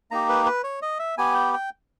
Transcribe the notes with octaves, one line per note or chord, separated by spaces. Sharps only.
A#3 D#4 G4 A#5
B4
B4
C#5
D#5
E5
B3 G4 G#5
G5
G5